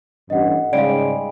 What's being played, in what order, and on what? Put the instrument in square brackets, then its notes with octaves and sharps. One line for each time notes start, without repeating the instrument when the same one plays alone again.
[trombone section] A1 G2 [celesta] D#5 F#5
[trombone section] G#2 C#3 [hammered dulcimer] G3 G#3 [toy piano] D5 F5 [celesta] D7